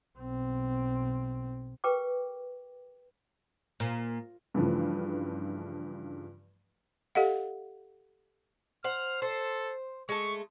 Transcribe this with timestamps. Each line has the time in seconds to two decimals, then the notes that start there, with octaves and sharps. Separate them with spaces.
0.18 B1 C4
1.84 G4 A#4 B4 G5 D6
3.80 A#2
4.54 G2 C#3 E3 F3 A3
7.15 G4 A4 D#5 F5 F#5
8.84 C5 F#5 F6
9.22 A4 C5
10.09 G#3 A3 C#6